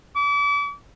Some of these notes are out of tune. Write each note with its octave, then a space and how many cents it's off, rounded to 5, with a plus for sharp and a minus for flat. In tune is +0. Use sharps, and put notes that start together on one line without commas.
D6 -40